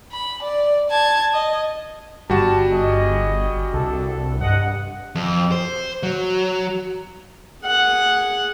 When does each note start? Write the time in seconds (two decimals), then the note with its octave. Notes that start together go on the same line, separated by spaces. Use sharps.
0.12 B5
0.42 D5
0.90 A5 G#6
1.33 D#5
2.30 G1 G3 F#4 A5
2.71 G#4 D#5
3.74 C2 D4 A4
4.41 G2 D#5 F#5
5.15 F2
5.52 C5
6.03 F#3
7.64 G#4 F#5